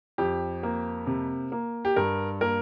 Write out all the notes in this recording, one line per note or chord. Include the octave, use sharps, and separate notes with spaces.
F2 G4
A#3
C3
A#3
G4
G2 A#4
A#3 A#4